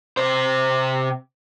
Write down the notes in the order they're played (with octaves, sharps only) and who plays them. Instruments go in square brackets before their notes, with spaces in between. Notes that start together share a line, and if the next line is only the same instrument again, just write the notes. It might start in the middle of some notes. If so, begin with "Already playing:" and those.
[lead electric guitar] C3 C5